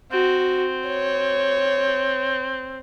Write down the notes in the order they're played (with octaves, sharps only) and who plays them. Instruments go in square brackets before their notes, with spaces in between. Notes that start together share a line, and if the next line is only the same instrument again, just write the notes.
[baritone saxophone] C4 [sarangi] F#4
[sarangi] C#5